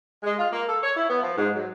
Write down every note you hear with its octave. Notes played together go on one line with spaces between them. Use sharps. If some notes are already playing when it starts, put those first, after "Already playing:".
G#3
F4
A#3
A4
C#5
E4
B3
F3
G#2
F#3